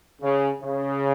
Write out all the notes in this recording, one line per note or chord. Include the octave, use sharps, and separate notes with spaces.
C#3
C#3